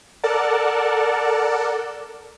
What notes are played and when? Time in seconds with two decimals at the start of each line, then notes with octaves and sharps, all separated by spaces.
0.24 A4 A#4 D5 F#5 A5